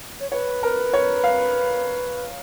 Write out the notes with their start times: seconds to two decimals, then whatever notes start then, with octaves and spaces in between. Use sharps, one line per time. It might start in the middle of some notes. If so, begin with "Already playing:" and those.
0.20 C#5
0.31 B4 C#5
0.63 A#4
0.94 C#5
1.24 F5